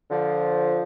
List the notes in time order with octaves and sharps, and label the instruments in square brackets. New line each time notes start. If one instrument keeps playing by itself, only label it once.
[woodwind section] D3 F3